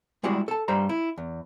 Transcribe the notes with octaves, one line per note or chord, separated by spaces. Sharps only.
G3 G#3 E4 F#4 G#4 D5
A4 A5
G2 G3 C5 A#5
E4
E2